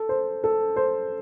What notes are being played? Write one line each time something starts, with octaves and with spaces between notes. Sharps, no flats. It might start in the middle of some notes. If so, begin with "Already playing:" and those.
Already playing: A4
C5
A4
C5